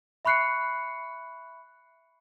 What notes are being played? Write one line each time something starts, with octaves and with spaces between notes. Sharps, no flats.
E5 B5 C#6 F#6 C7 C#7